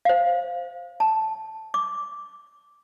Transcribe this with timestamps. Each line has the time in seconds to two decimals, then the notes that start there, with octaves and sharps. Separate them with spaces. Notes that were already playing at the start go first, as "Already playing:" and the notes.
0.05 C5 F5
1.00 A5
1.74 D6